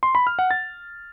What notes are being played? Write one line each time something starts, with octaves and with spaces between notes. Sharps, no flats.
C6
B5
F6
F#5
A6